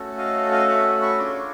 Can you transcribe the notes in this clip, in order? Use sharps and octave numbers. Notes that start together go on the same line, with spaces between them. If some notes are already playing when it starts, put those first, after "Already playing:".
Already playing: A3 C#4 F#4 A4
D#5 F5
D#5 F5
E5 F#5
B5 C#6
D4 F4 G#4 C6 D6